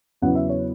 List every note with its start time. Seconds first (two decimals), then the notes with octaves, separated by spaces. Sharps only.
0.22 E2 C#3 F#3 B3 E4 F#5
0.35 E5
0.50 C#5